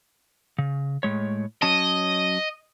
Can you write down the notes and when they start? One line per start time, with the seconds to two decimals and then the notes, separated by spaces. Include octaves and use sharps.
0.58 C#3
1.03 A2 G#3 C#5
1.62 F#3 C#4 D#5 A5